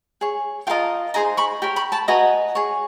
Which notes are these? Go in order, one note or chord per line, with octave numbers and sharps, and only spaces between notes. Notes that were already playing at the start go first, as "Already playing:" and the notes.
G#4 C#5
F4 A#4 D#5 G5 A5
D#4 G#4 C5 G#5 A#5
B5 C#6
G4 A#4 C#5
B5 C#6
A5 B5
F#4 B4 D#5 G#5 A#5
G#4 C#5